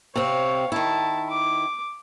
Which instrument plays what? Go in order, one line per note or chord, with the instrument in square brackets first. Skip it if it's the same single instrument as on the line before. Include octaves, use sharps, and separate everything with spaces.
[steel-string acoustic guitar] C3 C4 [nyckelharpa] C#5 F5
[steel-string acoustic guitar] D#3 E4 [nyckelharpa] A5
[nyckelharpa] D6